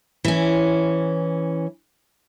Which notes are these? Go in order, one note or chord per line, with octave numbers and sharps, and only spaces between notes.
E3 C#4